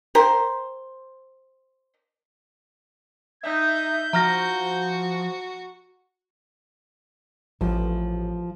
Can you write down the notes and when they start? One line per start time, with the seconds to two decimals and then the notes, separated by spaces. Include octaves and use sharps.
0.15 G4 A#4 C5
3.43 D#4 E5 G6
4.13 F3 F#4 A#5 F6 A#6
7.61 A1 F3